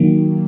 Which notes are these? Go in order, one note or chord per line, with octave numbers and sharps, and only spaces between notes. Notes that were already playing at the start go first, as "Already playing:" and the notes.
Already playing: D#3 F#3 A#3